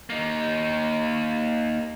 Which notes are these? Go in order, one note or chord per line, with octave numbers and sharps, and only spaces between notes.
A#3 D#4